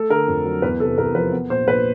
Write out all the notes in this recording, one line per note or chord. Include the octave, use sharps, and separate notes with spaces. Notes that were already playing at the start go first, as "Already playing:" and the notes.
Already playing: A3 A4
D3 A#4
F2
F#3
E2 B4
C3 A4
E2 A#4
F3 B4
B3
A#2 C5
A#1 B4